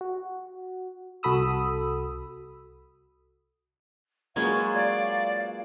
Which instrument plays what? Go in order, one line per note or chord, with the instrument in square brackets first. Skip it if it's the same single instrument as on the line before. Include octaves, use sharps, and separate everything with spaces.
[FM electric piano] F#4
C2 F#4 A4 B5 D#6 E6
[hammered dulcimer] F#3 F4 B4 [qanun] G#3 A#3 C#4 [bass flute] F5 [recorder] G#6
[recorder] D5